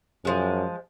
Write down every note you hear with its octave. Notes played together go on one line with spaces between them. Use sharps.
F#2 F3 G#3